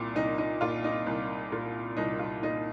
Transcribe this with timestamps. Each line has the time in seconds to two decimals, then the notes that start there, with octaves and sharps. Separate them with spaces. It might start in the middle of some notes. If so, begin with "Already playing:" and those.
Already playing: C2 A#2
0.15 C2 D#4
0.38 D#4
0.61 A#2 F4
0.84 D#4
1.06 C2
1.52 A#2
1.97 C2 D#4
2.19 F4
2.43 A#2 D#4